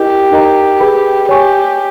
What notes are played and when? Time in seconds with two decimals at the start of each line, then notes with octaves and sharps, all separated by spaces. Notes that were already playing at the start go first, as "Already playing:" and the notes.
Already playing: E4 G4 A#4 D#5
0.31 D#4 A#4 D#5 A#5
0.80 G#4 B4 G5 B5
1.29 G4 C#5 G#5 C#6